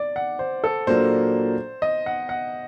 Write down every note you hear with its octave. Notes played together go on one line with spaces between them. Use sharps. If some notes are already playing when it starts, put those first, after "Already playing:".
Already playing: D5
F#5
C5
A4
A#2 F#3 A#3 D4 A4 C5
D#5
F#5
F#5